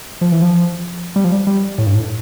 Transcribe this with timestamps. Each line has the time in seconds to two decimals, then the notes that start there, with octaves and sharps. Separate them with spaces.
0.21 F3
0.32 E3
0.42 F3
1.16 G3
1.24 F3
1.32 G3
1.47 G3
1.78 A2
1.86 G2
1.95 A2